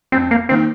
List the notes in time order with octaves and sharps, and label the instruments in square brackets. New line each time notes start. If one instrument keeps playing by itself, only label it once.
[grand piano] F2 [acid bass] C4
[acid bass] A#3
[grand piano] D#3 A#3 [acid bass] C4